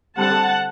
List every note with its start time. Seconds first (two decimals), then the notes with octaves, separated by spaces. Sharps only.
0.17 D3 G3 C4 F#5 A5